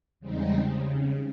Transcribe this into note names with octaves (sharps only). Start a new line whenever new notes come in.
E2 C#3 G3 G#3 C4 D#4
C#3